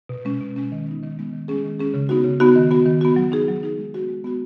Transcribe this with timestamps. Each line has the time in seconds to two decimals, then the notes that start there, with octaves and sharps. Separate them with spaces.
0.09 B2
0.25 G#3 C#4
0.41 B2
0.56 G#3 C#4
0.72 D#3
0.86 G#3 B3 D#4
1.02 D#3
1.17 G#3 B3 D#4
1.33 D#3
1.48 G#3 C#4 G#4
1.64 D#3
1.79 G#3 C#4 G#4
1.94 C#3
2.09 B3 D#4 F#4
2.24 C#3
2.40 B3 D#4 F#4
2.56 D#3
2.71 B3 F#4
2.86 D#3
3.01 B3 F#4
3.16 F#3
3.32 D#4 G#4
3.48 F#3
3.63 D#4 G#4
3.78 G#3
3.94 B3 F#4
4.09 G#3
4.24 B3 F#4